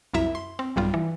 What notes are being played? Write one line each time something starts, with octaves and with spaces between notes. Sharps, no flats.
C2 F#2 E4 E5 A#5
C6
C4
B1 G2 G3 F4
E3